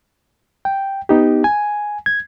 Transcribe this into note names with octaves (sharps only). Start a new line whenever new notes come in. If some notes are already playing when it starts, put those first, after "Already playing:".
G5
B3 D#4 G4
G#5
G#6